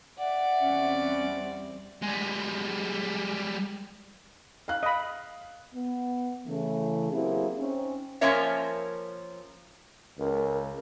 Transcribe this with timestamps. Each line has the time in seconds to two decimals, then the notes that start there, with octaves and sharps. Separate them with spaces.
0.19 D5 E5 F#5
0.62 E2 G3 C4 C#4
2.02 G3 G#3
4.68 F5 F#6
4.83 D#5 B5
5.74 B3
6.47 C#3 E3 A3
7.12 F#3 A#3 C4 E4 G4 G#4
7.57 C4 C#4 D#4
8.21 F3 A#3 C#4 A#4 C#5 E5
10.19 C#2 A#4